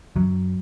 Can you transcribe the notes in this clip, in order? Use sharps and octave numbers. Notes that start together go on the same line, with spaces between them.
F#2 F#3